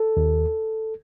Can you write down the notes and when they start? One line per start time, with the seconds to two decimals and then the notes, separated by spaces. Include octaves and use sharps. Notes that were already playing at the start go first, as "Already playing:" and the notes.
Already playing: A4
0.17 D#2